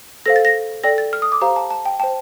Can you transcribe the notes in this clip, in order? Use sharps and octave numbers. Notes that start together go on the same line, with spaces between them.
A4 C5 F5 A#6
A6
A#6
A4 D5 G5 A#6
A6
F6
D#6
D6
G4 C5 F5 A#5
A5
A5
G5
C5 G5 A5